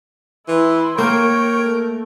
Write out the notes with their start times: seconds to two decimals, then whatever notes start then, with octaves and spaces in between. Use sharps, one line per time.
0.48 E3 E4 C6
0.98 A#3 A#4 C#5 G5
1.63 A3